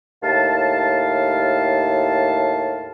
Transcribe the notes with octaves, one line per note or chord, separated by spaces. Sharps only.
D#2 A2 F5 A5